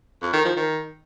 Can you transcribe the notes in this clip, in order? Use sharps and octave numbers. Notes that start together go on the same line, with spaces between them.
F2
D#3
F3
D#3